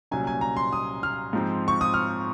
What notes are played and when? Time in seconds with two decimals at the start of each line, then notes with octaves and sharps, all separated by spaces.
0.11 C2 A#2 F#3 C#4 G#5
0.27 G#5
0.41 A#5
0.57 C6
0.73 D#6
1.03 F6
1.33 G#2 F3 C4
1.68 C#6
1.81 D#6
1.94 F6